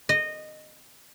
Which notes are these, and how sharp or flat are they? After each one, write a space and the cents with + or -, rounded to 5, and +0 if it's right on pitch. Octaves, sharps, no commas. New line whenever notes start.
D#5 -15